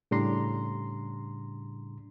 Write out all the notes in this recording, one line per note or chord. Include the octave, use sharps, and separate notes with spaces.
A2 C#3 G3 D4 A#5 C6